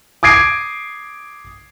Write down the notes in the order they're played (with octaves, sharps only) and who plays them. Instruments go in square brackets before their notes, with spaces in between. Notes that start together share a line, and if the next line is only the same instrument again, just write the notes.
[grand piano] D6 D#6 G#6 C7 D7